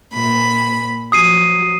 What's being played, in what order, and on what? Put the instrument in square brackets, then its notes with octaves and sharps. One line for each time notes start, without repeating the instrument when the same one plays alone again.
[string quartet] A#2 B5
[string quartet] F3 F#3 [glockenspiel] D#6 C7 D#7